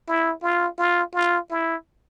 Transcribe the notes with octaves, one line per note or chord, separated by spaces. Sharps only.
E4
F4
F4
F4
E4